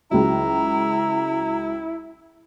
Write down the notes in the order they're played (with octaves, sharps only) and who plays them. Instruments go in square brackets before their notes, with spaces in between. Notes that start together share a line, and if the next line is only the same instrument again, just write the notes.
[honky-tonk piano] C#2 F#3 [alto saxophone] E4 [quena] A#5